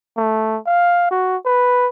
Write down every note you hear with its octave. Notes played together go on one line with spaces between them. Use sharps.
A3
F5
F#4
B4